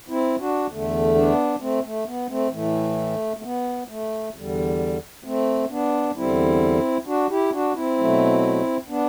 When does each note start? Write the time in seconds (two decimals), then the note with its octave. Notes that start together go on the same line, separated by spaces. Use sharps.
0.09 C4 E4
0.40 D4 F#4
0.69 E2 D3 A3
1.14 B3 D4
1.60 A3 C4
1.84 A3
2.06 B3
2.29 A3 C4
2.51 A2 E3 A3
3.37 A3
3.43 B3
3.88 A3
4.34 E2 D3 G3
5.24 A3 C4
5.70 B3 D4
6.16 E2 D3 G3 C4 E4
7.06 D4 F#4
7.30 E4 G4
7.52 D4 F#4
7.75 C4 E4
7.98 B2 F#3 A3
8.89 B3 D4